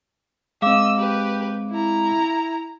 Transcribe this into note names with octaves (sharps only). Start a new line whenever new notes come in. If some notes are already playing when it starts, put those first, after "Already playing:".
G#3 C4 D#5 F5 D6 E6
G4 B4
E4 A#5